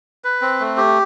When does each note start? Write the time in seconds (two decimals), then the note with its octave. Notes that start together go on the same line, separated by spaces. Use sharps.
0.24 B4
0.42 C4
0.60 A3
0.77 G4